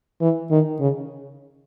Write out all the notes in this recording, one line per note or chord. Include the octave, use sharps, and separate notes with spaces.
E3
D#3
C#3